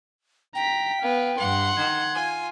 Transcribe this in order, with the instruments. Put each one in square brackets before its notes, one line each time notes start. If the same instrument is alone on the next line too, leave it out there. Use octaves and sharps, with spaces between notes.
[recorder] G5 [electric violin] A#5 B6
[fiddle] B3 [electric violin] F5
[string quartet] G2 [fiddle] F#5 [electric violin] C6
[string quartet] D#3 [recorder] G#6
[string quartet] F4 G#5